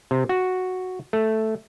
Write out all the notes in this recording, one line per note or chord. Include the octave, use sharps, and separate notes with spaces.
C3
F#4
A3